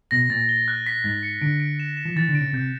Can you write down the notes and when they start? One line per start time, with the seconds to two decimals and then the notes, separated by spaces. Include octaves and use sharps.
0.11 B2 A#6
0.30 A#2 A6
0.49 G7
0.68 F#6
0.86 B6
1.04 G#2 A6
1.23 C#7
1.41 D3 D7
1.60 D7
1.80 E7
1.97 E7
2.05 F3
2.16 E3 A6
2.29 D3
2.35 D7
2.41 C#3
2.53 C3 G6